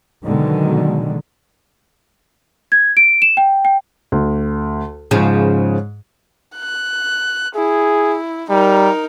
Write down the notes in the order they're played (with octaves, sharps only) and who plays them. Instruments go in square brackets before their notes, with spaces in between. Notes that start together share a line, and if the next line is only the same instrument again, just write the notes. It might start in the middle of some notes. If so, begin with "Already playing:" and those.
[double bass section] B2 D3 D#3 F#3 G#3
[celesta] G#6
D7
E7
G5
G5
[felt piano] D2
[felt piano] G#2 G#4 [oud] C#3 F3
[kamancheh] F#6
[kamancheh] E4 [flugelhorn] G#4
[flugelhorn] G3 [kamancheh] D#4 A#4